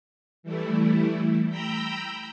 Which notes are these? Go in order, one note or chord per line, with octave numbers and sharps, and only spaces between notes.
E3 G3 A3 E4
G5 A#5 B5 E6 G6